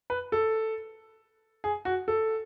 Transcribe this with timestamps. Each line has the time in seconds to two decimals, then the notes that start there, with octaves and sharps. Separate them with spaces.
0.10 B4
0.32 A4
1.64 G#4
1.85 F#4
2.08 A4